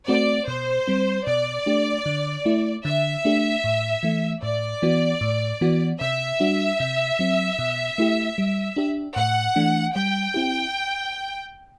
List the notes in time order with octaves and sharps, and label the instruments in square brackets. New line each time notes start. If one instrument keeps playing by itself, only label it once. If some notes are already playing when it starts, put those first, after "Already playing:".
[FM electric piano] A3 C4 F#4 [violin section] D5
[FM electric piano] B2 [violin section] C5
[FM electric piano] G3 C4
[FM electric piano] B2 [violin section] D5
[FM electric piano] A3 D4 G4
D3
A3 E4
[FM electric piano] D3 [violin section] E5
[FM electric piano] A3 D4 G4
A2
E3 A3
[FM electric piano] A2 [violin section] D5
[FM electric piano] E3 B3 F#4
A2
E3 B3 F#4
[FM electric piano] C3 [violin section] E5
[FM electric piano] G3 D4 F#4
C3
F#3 C4
B2
A3 E4 G4
G3
D4 G4
[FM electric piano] A2 [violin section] F#5
[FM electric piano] E3 A3 D4
[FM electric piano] G3 [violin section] G5
[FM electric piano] C4 E4 G4